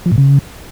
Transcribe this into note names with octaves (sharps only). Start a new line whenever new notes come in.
F3
A2
C#3